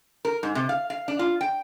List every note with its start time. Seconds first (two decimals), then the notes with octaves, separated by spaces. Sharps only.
0.25 A#4
0.43 G#2
0.55 C3
0.69 F5
0.90 F5
1.08 D4
1.19 F4
1.41 G5